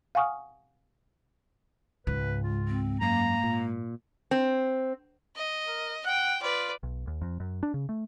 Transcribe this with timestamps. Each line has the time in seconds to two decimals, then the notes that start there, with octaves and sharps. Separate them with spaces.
0.15 F5 F#5 G#5 C#6 D#6 F6
2.07 C#2 G#2 B4
2.43 F4
2.68 C4
3.01 F#2 A#3 A#5
3.44 A#2
4.31 C4
5.36 D#5
5.67 A#4
6.05 F#5 G5
6.42 F4 B4 D5
6.83 B1
7.07 D#2
7.22 F2
7.40 F#2
7.63 D4
7.74 C#3
7.89 A3